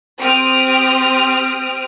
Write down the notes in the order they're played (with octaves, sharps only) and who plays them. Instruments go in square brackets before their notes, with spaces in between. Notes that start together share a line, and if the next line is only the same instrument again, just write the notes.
[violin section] C4 G4 D#6 F6 D7